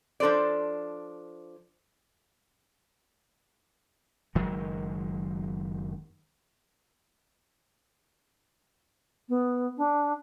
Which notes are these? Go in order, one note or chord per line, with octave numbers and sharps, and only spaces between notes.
F3 D4 A4 C5 D5
F#1 D#3 F#3 G#3
B3
D4